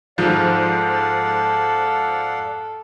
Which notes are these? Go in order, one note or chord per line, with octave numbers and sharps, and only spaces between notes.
G#2 F3 A4 D5 F5 F#5